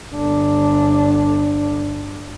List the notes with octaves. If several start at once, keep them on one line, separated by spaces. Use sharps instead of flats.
G1 D4